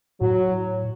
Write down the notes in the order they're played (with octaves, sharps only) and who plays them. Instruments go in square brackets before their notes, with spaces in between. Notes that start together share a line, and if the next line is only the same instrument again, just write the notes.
[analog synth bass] A2 [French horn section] F#3